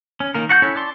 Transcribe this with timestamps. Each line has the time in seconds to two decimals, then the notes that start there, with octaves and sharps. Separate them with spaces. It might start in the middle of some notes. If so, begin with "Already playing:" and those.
0.20 C#4
0.34 D#3 A#3 A#4
0.49 F#4 F#5 A5 G6
0.62 C#4 E4 A4 C#5
0.76 D5 A5 C6